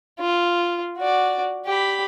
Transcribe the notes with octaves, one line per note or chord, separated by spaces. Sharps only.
F4
F#4 D5
G4 B5